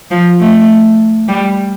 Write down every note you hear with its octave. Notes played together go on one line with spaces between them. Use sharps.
F3
A3
G3